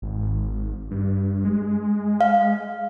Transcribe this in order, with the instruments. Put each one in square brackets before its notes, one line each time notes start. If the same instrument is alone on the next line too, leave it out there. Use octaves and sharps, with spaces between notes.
[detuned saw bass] G#1
G2
G#3
[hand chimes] F5